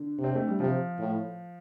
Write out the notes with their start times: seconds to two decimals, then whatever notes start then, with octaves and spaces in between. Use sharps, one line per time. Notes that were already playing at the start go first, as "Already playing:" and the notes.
Already playing: D3
0.19 C3
0.24 C4
0.35 A3
0.48 G3
0.60 C3 F3
1.00 A2